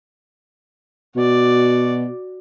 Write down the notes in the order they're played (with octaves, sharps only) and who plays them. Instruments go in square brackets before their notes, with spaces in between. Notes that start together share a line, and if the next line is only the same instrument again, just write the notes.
[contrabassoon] B2 [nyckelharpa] F#4 D5